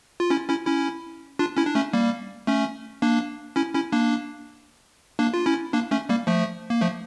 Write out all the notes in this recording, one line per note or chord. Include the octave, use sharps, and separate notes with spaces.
F4
C#4 E4
C#4 E4
C#4 E4
D4 F4
C#4 E4
D4
A3 C#4
G3 A#3
A3 C#4
A#3 D4
C#4 E4
C#4 E4
A#3 D4
A#3 D4
F4
C#4 E4
A#3 D4
A3 C#4
G3 A#3
F3 A3
A#3
F3 A3